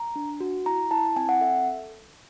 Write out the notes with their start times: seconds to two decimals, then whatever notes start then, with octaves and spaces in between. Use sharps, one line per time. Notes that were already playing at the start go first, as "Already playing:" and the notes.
Already playing: A#5
0.16 D4
0.40 F#4
0.66 E4 A#5
0.91 E4 A5
1.16 C4 G#5
1.29 F#5
1.41 A4 E5